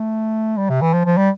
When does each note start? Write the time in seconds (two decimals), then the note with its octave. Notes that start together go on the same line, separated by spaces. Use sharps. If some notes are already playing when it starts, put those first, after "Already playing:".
Already playing: A3
0.57 G3
0.70 C3
0.81 E3
0.94 F3
1.05 F3
1.17 G3